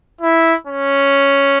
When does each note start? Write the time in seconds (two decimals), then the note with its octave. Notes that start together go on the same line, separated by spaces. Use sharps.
0.21 E4
0.67 C#4